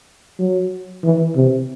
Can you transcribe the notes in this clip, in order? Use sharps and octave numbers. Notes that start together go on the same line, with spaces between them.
F#3
E3
C3